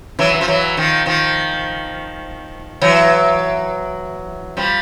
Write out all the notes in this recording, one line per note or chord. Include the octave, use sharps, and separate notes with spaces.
E3 F#3
E3
F3
E3 F#3
D#3 F3
D#3 F3
E3 F#3
F3 G3